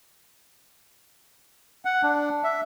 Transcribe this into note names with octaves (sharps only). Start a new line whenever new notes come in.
F#5
D4
E5